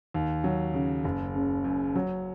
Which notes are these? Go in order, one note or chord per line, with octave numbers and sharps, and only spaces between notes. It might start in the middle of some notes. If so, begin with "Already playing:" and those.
D#2
F#3
C#3
F#1
C#3
F#2
F#3